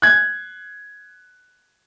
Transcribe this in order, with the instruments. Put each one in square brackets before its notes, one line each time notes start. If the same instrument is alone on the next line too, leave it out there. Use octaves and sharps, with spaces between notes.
[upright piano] F#6 G#6